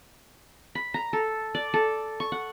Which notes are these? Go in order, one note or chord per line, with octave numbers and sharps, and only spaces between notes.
B5
A#5
A4
D5
A4
C#6
F#5